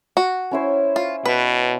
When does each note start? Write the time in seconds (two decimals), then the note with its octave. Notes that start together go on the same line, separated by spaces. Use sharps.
0.17 F#4
0.51 C#4 E4 C5
0.96 F4
1.26 B2 B4